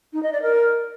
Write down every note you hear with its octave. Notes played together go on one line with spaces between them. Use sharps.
D#4
D#5
D5
A#4